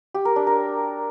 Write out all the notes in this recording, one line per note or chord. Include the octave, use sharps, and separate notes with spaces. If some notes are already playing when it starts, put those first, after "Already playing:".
G4
A#4
D4
A#4